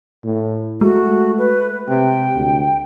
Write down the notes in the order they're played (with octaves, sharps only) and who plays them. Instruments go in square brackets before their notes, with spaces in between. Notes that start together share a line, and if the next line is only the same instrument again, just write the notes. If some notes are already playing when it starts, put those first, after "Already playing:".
[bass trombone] A2
[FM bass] G#3 [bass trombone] A3 [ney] F#4
[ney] B4
[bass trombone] C3 [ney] G5
[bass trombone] D2